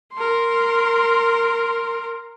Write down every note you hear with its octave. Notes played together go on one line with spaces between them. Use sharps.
A#4 C6